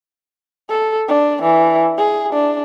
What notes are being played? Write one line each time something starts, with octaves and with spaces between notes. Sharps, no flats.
A4
D4
E3
G#4
D4